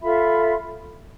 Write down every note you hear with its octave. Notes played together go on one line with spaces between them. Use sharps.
F4 A4 E5 B5